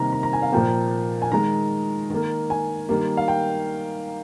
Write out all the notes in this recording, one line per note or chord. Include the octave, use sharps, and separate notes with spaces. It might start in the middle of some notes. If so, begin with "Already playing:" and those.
Already playing: C3 D#3 G3 A#3 A#5
A#5
A#5
G#5
F5
A#2 F3 A#3 G5
G#5
D#3 G#3 A#5
D#3 A#3
G#5
D#3 G3 A#3
F5
G5